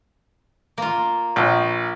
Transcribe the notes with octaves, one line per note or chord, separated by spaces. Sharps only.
A#3 F4
A#1 G5